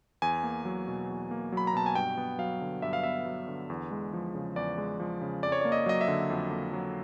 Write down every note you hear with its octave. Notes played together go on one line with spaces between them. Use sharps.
E2 G#5
A#3
F#3
B2
E2
A#3
F#3 B5
A#5
B2 A5
G#5
G2 G5
B3
F#3 F5
D3
G2 E5
F5
B3 E5
F#3
D3
E2
G#3
F3
C#3
E2 D5
G#3
F3
C#3
F2 D5
C#5
D5
A#3
D#5
F#3 D#5
E5
D3
F2
A#3
F#3